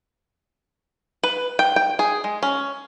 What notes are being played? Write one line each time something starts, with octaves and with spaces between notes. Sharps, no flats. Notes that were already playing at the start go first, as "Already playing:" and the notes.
B4
G5
G5
G#4
G#3
C#4